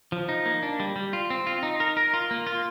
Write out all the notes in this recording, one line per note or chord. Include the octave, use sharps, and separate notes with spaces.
F3
D#4
A#3
D4
G3
G3
F4
C4
F4
D#4
A#4
A#4
F4
A#3
F4